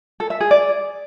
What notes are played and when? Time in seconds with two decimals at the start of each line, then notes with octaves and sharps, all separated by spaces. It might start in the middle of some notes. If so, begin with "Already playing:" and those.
0.20 A4
0.30 E5
0.40 G#4
0.51 D5